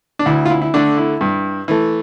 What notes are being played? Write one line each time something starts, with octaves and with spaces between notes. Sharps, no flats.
D4
D2 E4
F4
E4
E4
D3 A3 D4
E4
G2
E3 A3